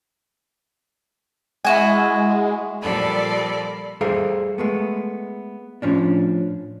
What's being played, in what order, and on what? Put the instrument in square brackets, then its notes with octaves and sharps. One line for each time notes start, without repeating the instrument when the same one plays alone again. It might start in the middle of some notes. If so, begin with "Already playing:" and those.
[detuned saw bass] G#3 [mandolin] E4 F#4 G#5
[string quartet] A#2 F3 G3 A4 D5 B5
[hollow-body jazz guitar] G3 G#4 A4 C5 E5 F5
G#3 A3 B3
A2 F3 C#4 D4